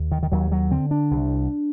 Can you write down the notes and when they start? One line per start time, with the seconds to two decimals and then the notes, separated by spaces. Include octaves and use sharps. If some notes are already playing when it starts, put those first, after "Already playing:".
Already playing: D#2
0.12 D#3
0.23 D#3
0.32 D#2 F#3
0.52 F#3
0.71 D3 C4
0.91 D4
1.11 C2